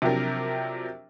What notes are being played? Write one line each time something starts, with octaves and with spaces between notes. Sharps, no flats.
C3 F3 F#3 D4 G4 A#4